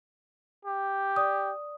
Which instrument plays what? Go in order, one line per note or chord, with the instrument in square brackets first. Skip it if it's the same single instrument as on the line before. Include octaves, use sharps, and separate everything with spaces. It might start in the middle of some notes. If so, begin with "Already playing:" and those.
[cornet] G4
[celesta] D5 D#6